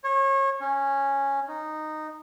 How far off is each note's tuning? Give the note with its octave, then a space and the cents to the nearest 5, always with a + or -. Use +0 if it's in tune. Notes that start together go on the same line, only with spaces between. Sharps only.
C#5 -30
C#4 -10
D#4 -10